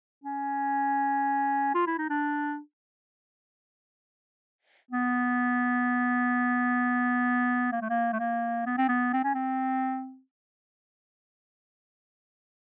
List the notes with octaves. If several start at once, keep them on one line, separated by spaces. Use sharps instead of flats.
C#4
F4
E4
D#4
D4
B3
A#3
A3
A#3
A3
A#3
B3
C4
B3
C4
C#4
C4